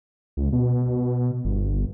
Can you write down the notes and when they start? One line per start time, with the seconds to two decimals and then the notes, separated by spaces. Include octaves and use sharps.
0.37 C#2
0.53 B2
1.45 G1